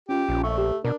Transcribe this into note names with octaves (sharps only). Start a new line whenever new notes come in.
C#4 F4 G4
A#1
A3 C#6
G4
B2 D4 A#4